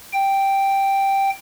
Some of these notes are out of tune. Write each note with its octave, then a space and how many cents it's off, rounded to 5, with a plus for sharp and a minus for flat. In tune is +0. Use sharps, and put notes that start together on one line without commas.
G5 +0